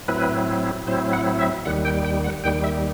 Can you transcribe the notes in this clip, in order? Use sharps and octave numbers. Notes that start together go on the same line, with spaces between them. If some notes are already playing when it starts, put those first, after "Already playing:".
A2 F#3 C4 E4 B4
A2 F#3 C4 E4 C5
F#5
E5
D#2 D#3 G3 F#5
G5
G5
F#5
D#2 D#3 G3 G5
E5